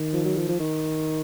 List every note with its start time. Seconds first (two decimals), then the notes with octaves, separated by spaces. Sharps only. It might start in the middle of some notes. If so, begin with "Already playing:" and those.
Already playing: D#3
0.13 F3
0.25 F#3
0.37 F3
0.48 F3
0.60 D#3